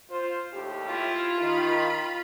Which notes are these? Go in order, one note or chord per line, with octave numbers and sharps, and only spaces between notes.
F4 C5
D#2 A2 G4
E4 F4
D#3 B5